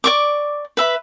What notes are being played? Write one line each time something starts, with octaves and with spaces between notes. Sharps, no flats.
D5 C#6 D6
B4 E5 B5